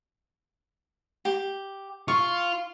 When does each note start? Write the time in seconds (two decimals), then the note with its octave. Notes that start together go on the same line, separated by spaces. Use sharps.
1.25 G4
2.08 F4 C#6